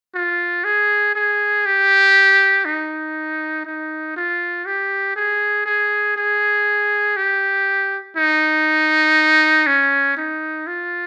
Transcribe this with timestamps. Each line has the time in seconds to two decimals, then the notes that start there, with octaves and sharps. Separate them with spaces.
0.15 F4
0.64 G#4
1.15 G#4
1.66 G4
2.65 D#4
3.65 D#4
4.17 F4
4.66 G4
5.16 G#4
5.66 G#4
6.16 G#4
7.17 G4
8.17 D#4
9.67 C#4
10.17 D#4
10.67 F4